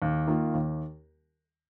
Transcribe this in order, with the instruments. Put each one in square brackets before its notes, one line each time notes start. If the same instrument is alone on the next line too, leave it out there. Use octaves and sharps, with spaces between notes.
[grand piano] D#2
D#3 A#3 F4
D#2